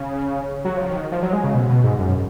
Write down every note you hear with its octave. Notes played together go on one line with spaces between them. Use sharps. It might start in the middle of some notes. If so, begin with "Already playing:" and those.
Already playing: C#3
F#3
F3
D#3
F3
F#3
G#3
C#3
B2
B2
G#2
F#2